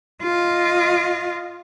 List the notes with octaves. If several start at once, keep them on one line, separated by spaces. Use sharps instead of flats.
F4 D#5